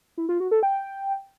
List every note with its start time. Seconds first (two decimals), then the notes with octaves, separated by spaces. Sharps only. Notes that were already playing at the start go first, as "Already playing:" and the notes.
0.17 E4
0.29 F4
0.40 F#4
0.51 A4
0.63 G5